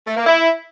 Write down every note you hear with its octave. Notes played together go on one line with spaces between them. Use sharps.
A3
A#3
E4